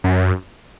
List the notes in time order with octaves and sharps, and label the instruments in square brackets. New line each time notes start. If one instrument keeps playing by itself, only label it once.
[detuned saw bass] F#2